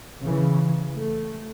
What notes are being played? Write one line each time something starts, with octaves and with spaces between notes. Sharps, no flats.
C#3 E3
A3